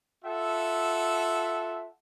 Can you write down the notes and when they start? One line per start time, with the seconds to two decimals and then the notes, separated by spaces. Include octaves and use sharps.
0.24 F4 A4 E5 F#5